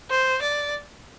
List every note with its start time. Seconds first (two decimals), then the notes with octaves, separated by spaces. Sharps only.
0.10 C5
0.42 D5